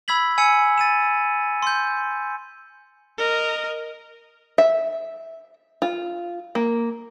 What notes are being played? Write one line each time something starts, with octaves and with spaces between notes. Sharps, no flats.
B5 E6 G#6 B6 F#7
G#5 E6 G#6 C#7
A6 D#7 E7
C6 G6
A#4 D#5
E5
F4
A#3